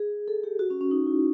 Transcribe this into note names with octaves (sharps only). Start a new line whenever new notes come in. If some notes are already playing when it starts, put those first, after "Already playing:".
Already playing: G#4
A4
G4
F#4
C#4
C#4
D#4
E4